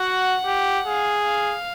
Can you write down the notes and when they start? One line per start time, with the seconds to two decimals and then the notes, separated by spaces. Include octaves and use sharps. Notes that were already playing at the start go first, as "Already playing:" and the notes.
Already playing: F#4 F#5
0.46 G4
0.86 G#4 F5
1.25 F5